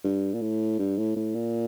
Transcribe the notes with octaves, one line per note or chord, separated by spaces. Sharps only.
G2
A#2
A2
G2
A2
A2
A#2